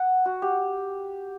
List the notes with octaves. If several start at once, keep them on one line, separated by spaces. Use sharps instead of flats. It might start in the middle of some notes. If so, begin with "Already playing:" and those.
Already playing: F#5
F#4
G4